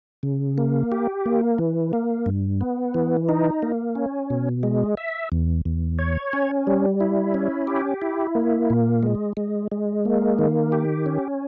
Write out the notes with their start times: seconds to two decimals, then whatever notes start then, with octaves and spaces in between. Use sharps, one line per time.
0.23 C#3
0.58 A#3
0.92 G4
1.26 A#3
1.58 E3
1.93 A#3
2.26 G2
2.61 B3
2.94 E3
3.29 D#4
3.62 A#3
3.95 C#4
4.30 B2
4.63 G#3
4.97 E5
5.32 E2
5.65 E2
5.99 C#5
6.33 C#4
6.67 G3
7.00 E4
7.34 C#4
7.67 G4
8.02 E4
8.35 A#3
8.70 A#2
9.03 G#3
9.37 G#3
9.72 G#3
10.05 A#3
10.39 D#3
10.72 G4
11.06 C#4